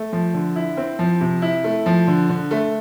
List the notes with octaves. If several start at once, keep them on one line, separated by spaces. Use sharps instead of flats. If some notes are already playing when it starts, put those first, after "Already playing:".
Already playing: A3
F3
D3
E4
C4
F3
C3
E4
A3
F3
D3
D3
A3